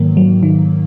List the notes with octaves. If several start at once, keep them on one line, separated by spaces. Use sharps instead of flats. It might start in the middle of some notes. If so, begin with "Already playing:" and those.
Already playing: G#2 D#3 F#3 A#3
F#3
D#3